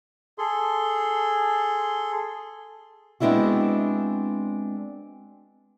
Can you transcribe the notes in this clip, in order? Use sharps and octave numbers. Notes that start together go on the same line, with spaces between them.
G#4 A4 C6
G#3 B3 C4 D4 E4 F#4